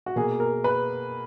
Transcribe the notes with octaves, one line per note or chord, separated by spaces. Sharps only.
F#4
B2 A#3 G#4
A#4
B4